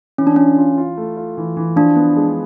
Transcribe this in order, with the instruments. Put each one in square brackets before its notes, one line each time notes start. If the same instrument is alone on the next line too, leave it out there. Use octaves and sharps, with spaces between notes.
[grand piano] E3 [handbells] C#4
[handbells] D4
[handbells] C#4 [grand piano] F4
[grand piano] F4
F4
A3
F4
E3
E3
[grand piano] F3 [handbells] D4
[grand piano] B3
G#3